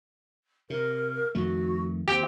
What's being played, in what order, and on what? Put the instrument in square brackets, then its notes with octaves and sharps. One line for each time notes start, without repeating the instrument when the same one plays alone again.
[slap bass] C3 [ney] A#4
[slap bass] F2 D#3 A3 [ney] F#4
[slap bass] D#2 [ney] C4 [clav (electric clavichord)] G4 G5